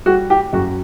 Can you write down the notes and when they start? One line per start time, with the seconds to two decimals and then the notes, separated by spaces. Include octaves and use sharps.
0.06 G3 F#4
0.30 G4
0.53 F#2 F#4